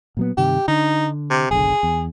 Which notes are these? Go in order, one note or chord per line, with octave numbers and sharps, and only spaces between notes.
A#2 F#3 B3
G2 C3 D#3 G4
D3 D#4
C3
F#1 B1 D3 G#4
E2